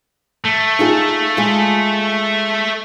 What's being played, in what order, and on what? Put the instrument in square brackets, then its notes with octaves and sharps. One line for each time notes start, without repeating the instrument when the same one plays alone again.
[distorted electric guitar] A3
[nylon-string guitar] D#4 F4 G#4
G#3 F4